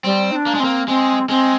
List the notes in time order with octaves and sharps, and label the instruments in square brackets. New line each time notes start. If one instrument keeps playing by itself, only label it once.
[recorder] G3 [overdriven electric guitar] C4
[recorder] D#4
D4
[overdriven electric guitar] A#3
G#3
[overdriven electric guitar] A#3 [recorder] C4
[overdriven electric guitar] G#3 [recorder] C4
[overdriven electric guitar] G#3 [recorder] C4